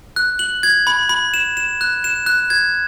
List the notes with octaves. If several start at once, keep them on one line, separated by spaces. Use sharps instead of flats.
F#6
F#7
G#6
B5
B5
E7
E7
F#6
E7
F#6
G#6